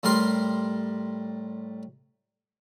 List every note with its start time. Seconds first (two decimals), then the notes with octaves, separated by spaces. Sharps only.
0.03 A2 G3 G4 A#4 C6